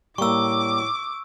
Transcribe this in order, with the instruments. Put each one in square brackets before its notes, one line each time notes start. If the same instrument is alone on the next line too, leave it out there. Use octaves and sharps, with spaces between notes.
[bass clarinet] A2 [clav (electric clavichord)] G3 A#3 [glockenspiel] C#6 E6 [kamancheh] D6